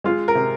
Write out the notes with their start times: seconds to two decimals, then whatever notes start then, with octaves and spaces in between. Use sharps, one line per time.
0.04 G#3 F4
0.28 A#4
0.35 C3